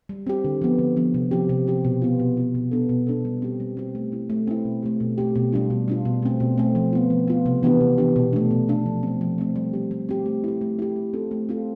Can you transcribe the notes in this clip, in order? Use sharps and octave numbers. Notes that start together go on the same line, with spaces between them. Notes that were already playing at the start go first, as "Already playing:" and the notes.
G3
C4 G4
D3
F3 B3
D3
F3 B3
C3
F3 C4 G4
C3
F3 C4 G4
B2
B3 F4
B2
B3 F4
B2
B3 D4 A4
B2
B3 D4 A4
G3
C4 G4
G3
C4 G4
A3
C4 E4
A3
C4 E4
B2
A3 C4 G4
B2
A3 C4 G4
B2
G3 D4 F4
B2
G3 D4 F4
B2
A3 C4
B2
A3 C4
F3
B3 F4
F3
B3 F4
C3
E3 B3 D4 G4
C3
E3 B3 D4 G4
B2
A3 D4
B2
A3 D4
F3
A3 C4
F3
A3 C4
G3
C4 G4
G3
C4 G4
A3
E4 G4
A3
E4 G4
A3
C4 F4 A4
A3
C4 F4 A4